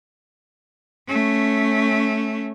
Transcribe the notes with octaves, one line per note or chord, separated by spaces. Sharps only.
A3 C#4